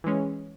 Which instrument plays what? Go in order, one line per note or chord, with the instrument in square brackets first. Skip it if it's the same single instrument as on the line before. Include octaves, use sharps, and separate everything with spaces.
[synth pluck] E3 G#3 C#4